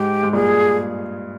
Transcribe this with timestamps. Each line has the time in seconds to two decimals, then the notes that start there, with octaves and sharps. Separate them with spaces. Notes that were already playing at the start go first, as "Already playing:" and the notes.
Already playing: G#2 G4
0.23 G#2
0.33 G2 A#2 G#4